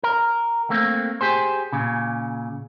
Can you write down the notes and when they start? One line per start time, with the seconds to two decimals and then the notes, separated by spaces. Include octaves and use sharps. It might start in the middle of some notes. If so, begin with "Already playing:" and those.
0.03 A#4
0.70 A3 A#3 C4
1.21 G4 G#4 C5
1.73 A#2 C#3